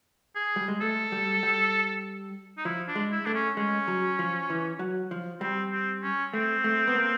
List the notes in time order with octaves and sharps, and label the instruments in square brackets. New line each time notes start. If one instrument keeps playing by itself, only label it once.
[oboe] G#4
[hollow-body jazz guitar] G3
G#3
[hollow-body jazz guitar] A3 [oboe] A4
[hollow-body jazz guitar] G3
G3
[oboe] D#4
[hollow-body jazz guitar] F3 [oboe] E4
[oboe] D4
[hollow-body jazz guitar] G#3
[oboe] E4
[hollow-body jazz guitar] A3 [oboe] D4
[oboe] C#4
[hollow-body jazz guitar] G#3 [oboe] C#4
[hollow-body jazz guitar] F#3
F3
E3
F#3
F3
[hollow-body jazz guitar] G3 [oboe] C4
[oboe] C4
C#4
[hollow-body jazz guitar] A3 [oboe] C4
[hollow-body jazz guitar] A3
B3
A#3